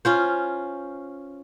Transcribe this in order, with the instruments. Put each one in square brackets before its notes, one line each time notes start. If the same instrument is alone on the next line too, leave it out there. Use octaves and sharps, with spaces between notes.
[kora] C#4 F4 C5